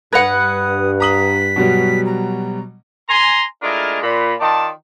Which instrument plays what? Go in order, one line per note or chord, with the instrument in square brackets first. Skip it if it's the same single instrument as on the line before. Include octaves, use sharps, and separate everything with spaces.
[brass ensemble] G2 [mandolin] B4 F#5 [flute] D#6 [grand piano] G#6 A#6 F7
[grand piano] A#5 D#6 F#7 [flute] B6
[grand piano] B2 F#3 G3
[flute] A#5
[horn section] G#5 A#5 C6
G#3 A3 D4 E4 F4 A#4
A#2 B5
D#3 F4 D5 A5